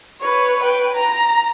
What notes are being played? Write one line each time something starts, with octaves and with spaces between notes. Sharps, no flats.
B4 C#5
B4 G5
A#5